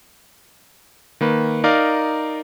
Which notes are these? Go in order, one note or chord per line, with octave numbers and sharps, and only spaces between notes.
D#3 A#3 B4
D#4 A#4 D5 F5